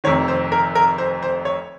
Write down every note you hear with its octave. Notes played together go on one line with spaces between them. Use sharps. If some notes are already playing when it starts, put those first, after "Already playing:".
F1 F2 D#3 C#5
C5
A#4
A#4
C5
C5
C#5